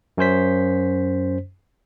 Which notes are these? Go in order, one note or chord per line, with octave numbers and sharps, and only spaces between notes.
F#2 C#4 C5 B6